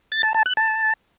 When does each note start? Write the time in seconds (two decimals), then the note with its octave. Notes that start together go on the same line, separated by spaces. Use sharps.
0.12 A6
0.23 A5
0.34 A5
0.46 F#6
0.57 A5